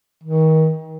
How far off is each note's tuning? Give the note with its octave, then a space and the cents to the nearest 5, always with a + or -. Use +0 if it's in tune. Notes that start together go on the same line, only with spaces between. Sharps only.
D#3 +30